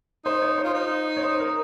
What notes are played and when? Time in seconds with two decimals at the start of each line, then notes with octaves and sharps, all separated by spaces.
0.25 D#4 C5
0.42 C#5
0.58 C5
0.64 F4
0.74 D#4
1.17 C#5
1.23 C5
1.40 A#4